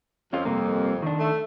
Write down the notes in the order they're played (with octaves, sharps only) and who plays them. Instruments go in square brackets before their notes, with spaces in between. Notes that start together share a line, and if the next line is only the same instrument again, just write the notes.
[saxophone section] F2 [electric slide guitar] C#4 F4
[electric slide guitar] G2 C3 A#3
D#3 D4
[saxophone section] A3